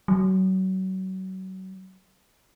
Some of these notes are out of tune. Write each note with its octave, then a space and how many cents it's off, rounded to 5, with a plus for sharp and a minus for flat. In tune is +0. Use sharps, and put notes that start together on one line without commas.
F#3 +30